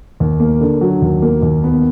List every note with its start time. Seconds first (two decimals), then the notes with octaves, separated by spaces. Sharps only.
0.20 D#2
0.40 A#3
0.61 D3
0.81 F#3
1.02 D#2
1.22 A#3
1.42 D#2
1.64 B3